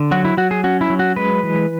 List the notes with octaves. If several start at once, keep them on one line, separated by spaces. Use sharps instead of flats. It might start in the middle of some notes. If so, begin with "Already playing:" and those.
Already playing: D3
F#3 F#4
E4
F#3 F#4
G#4
C#4 F#4
E4
F#3
F#4
G#3 B4
E3